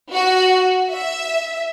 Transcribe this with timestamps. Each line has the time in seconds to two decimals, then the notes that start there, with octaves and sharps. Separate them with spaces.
0.13 F#4
0.92 E5